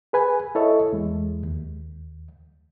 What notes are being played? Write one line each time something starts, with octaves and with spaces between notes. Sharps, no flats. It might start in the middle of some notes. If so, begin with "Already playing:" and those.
G#4 B4 G#5
E4 A4 C#5 D#5 E5
E2 G#3
D#2